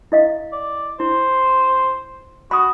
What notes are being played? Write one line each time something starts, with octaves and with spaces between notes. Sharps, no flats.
E4 D#5 F5
D5
E4 C5
F#4 B5 D#6